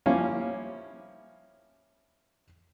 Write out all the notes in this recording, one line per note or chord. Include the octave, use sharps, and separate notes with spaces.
F3 G3 A#3 C#4 E4